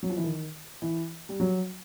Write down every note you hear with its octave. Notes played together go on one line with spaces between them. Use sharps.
F#3
F3
E3
D#3
E3
G3
F#3